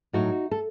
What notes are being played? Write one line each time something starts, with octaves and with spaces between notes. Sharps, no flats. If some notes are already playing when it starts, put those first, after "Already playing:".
A2 F#3 D#4 F#4
A4